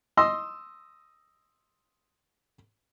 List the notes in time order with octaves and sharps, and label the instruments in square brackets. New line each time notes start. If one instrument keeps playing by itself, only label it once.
[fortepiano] D#5 C6 E6